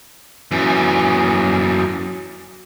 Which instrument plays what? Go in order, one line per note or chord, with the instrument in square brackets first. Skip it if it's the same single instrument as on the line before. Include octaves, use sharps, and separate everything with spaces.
[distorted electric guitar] F#2 E3